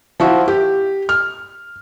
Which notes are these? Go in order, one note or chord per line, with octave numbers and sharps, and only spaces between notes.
F3 E4 F#4
G4
F6